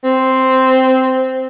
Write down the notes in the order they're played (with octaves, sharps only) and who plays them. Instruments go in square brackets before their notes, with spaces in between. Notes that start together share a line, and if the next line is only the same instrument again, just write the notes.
[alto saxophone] C4